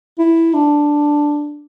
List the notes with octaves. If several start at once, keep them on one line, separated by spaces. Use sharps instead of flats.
E4
D4